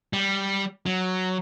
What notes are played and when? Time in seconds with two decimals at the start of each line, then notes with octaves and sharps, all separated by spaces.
0.13 G3
0.86 F#3